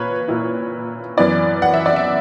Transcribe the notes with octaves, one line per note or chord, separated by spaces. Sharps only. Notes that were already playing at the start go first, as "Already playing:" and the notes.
Already playing: A#2 A#3 B4 C#5
A#2 A#3 E4
F#2 E3 B3 E4 D5
F#5
E5
D5
E5